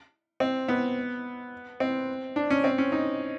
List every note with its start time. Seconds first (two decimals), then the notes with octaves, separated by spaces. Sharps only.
0.40 C4
0.68 B3
1.80 C4
2.36 D4
2.50 C#4
2.64 C4
2.78 C#4
2.92 D#4